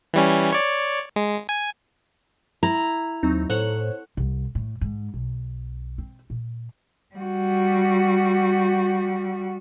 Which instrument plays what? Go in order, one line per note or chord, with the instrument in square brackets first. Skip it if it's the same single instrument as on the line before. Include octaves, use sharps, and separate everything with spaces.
[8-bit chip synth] E3 G3 C#4
C#5 D5
G#3
G#5
[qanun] E4 [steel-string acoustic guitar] A#5
[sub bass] D#2 [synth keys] F#3 C4 D#4
[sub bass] A2 [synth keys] A4 C5 C#5 [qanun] F#5
[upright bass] C2
A2
G#2
B1
C4
A#2
[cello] G3 F#4